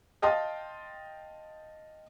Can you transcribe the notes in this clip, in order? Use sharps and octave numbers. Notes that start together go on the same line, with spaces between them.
D#5 F5 G5 A5 C6 D#6